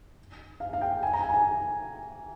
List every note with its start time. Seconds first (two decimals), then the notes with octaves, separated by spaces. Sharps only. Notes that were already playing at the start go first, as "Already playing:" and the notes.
0.60 F5
0.73 F5
0.81 G5
1.03 G#5
1.13 A#5
1.24 G#5
1.34 G#5